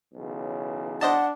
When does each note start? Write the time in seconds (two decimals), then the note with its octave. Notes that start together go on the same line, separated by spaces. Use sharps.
0.15 B1 C#3 E3
1.01 D4 C5 D#5 F#5 A5